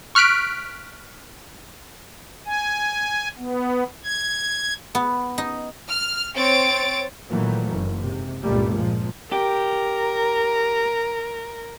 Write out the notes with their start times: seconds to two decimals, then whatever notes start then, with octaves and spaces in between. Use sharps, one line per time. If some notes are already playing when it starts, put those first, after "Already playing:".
0.15 C#6 F6 F#6 B6 D7
2.46 G#5
3.38 B3
4.04 G#6
4.95 B3
5.38 D#4
5.89 F6
6.36 C4 C#5 A6 D7
7.29 A#2 D#3 E3 F#3 A3 A#3
7.70 F#1
8.05 G#2 C3
8.42 C#2 G2 A#2 G3 A3 A#3
8.75 A#2 F3 G#3
9.32 G4 A#4